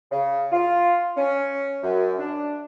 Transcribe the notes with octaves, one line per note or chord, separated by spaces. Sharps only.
C#3
F4
C#4
F#2
D4